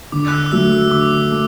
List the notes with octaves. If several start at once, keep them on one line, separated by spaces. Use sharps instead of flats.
D3 D6
F#6
E6
D6
F#3 A3 E6
E6
D3 D6
A3